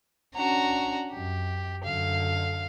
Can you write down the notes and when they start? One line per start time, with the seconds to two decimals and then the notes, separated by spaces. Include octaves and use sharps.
0.36 C#4 D4 F#4 A#5
1.13 F#2 G4
1.84 F#2 D3 F5